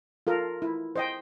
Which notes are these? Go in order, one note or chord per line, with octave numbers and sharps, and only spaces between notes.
F4 A4 A#4
E4
C5 D#5 G5